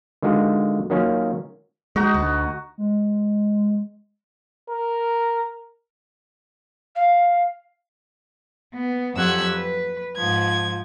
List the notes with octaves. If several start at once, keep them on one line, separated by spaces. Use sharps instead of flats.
D3 D#3 G#3 F4 F#4
D#3 F#3 A#3 C#4 F4
G#3 D#4 F#4 D#5
D2
G#3
A#4
F5
B3
F2 F#3 G4 F#5 E6 G#6
B4
G#2 F3 G#6